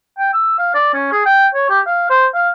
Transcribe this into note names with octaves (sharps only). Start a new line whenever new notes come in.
G5
E6
F5
D5
C#4
G#4
G5
C#5
G4
F5
C5
F5